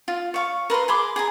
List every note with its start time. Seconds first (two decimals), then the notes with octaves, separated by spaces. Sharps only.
0.08 F4
0.34 C#5 F5 C#6
0.70 A#4 B4 A#5 C6
0.88 G#4 B5 C6 D6
1.16 G#4 G#5 A#5